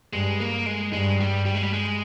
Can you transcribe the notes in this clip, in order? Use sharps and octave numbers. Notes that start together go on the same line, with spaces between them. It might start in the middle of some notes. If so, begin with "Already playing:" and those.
G2 G#3
A#3
G#3
G2 G#3
G3
G3
G#3
G3
G#3